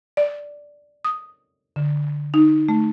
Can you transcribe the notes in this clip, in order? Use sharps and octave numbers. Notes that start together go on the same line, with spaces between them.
D5
D#6
D3
D#4
A3